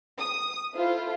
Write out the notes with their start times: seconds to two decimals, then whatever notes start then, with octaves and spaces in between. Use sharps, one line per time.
0.19 D#6
0.74 E4 F4 A4 C5